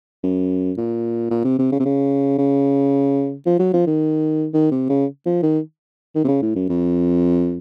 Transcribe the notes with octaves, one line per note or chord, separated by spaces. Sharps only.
F#2
A#2
A#2
C3
C3
C#3
C3
C#3
C#3
F3
F#3
F3
D#3
D#3
C3
C#3
F3
D#3
D#3
C3
C#3
A2
F#2
F2